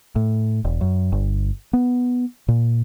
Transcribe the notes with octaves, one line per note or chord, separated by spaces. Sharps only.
A2
E1
F#2
G1
B3
A#2